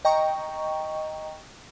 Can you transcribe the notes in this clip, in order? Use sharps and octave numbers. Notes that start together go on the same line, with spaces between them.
D#5 G5 A#5 C#6